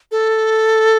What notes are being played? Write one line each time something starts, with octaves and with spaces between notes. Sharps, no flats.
A4